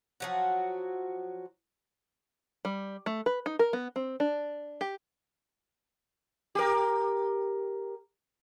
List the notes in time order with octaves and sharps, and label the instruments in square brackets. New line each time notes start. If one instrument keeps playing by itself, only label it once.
[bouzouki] F3 F#3 F#4
[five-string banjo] G3
A3
B4
D#4
A#4
B3
C4
D4
G4
[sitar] G4 A#4